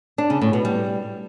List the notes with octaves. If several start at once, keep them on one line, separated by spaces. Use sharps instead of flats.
D4
C#3
A2
B2
G3